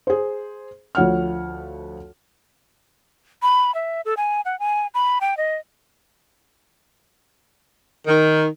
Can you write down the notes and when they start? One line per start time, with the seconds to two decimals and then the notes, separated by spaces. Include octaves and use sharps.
0.07 G#4 C5
0.95 D2 F3 C#5 F#5 F6
3.42 B5
3.75 E5
4.05 A4
4.17 G#5
4.45 F#5
4.60 G#5
4.94 B5
5.21 G5
5.37 D#5
8.07 D#3